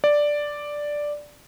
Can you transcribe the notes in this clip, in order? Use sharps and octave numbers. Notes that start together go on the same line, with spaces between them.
D5